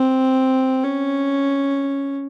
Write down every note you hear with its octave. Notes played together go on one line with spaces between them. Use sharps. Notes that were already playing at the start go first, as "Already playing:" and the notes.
Already playing: C4
C#4